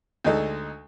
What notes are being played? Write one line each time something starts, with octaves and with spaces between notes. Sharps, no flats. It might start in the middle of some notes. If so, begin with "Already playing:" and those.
D2 G#3 D#4 A4